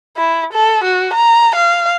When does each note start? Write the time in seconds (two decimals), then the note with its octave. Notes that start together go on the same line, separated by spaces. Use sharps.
0.17 E4
0.53 A4
0.84 F#4
1.14 A#5
1.56 F5